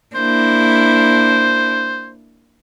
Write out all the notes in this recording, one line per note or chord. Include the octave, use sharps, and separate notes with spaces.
A#3 D4 E4 C5